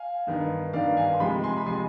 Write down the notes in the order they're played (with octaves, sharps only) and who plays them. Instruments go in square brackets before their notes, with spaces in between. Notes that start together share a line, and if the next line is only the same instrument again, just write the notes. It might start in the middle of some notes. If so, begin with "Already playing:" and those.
Already playing: [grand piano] F5 G#5
G2 D#3 B3
G2 D#3 B3 D5 F5
F5 G#5
C6
C3 F3 G#3 G5 B5
G#5 C6
B5
C3 F3 G#3 G#5 C6